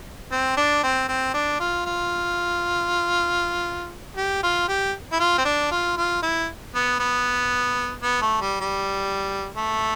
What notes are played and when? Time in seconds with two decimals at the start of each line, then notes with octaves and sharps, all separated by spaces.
0.32 C4
0.57 D4
0.83 C4
1.09 C4
1.34 D4
1.60 F4
1.86 F4
4.17 G4
4.43 F4
4.69 G4
5.13 E4
5.20 F4
5.38 C4
5.45 D4
5.72 F4
5.97 F4
6.23 E4
6.75 B3
7.00 B3
8.03 B3
8.22 A3
8.41 G3
8.60 G3
9.57 A3